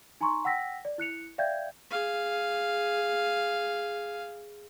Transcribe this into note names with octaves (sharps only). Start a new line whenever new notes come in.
D#4 G#5 A#5 C6 C#6
F#5 G5 E6 A#6 B6
D5
E4 F#6 C#7 F7
D5 E5 F5 G5 G6 G#6
G#4 F5